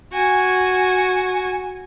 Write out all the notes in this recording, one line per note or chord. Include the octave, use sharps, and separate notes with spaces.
F#4 G#5